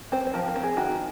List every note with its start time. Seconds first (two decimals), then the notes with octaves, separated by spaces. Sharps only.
0.12 C4 C5
0.27 C5
0.34 F3 A#4
0.48 A#4
0.56 C4
0.63 G#4
0.77 D#3 F#4